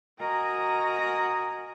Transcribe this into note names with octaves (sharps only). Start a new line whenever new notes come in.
F#4 A#4 D#5 G#5 A#5 D#6